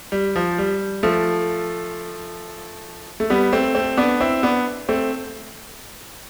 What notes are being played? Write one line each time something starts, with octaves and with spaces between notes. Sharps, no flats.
G3
F3
G3
F3 A3
A3
G3 B3
A3 C4
A3 C4
B3 D4
C4 E4
B3 D4
A3 C4